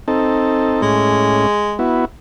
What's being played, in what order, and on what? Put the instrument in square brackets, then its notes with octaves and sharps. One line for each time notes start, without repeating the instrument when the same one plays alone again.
[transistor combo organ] C4 D#4 A4
[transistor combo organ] A2 C#4 [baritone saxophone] G#3
[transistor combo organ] B3 E4 F#4